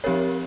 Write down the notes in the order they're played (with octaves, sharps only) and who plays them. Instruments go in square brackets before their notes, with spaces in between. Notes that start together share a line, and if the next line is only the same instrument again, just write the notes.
[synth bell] F3 C4 G4 A#4 C#5